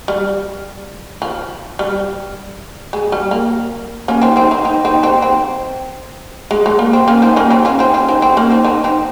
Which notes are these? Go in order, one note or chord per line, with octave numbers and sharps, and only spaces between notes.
G3
F3
G3
G#3
G3
A#3
A#3 C#4
C4 D#4
C4 D#4
C4 D#4
C4 D#4
C4 D#4
C4 D#4
C4
G#3
G#3
A#3
C4
A#3 C#4
C4 D#4
A#3 C#4
C4 D#4
C#4 F4
C4 D#4
C#4 F4
C4 D#4
C4
A#3 C#4
C4 D#4
C4 D#4
C4 D#4